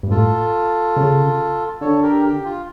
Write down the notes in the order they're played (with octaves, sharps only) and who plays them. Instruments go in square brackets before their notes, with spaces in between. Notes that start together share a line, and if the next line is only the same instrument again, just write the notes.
[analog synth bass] G2
[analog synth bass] A2 [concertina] F4 A4
[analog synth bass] C#3
[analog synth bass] D3 [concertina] A4 C#5
[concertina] G4 A#4
G4
F4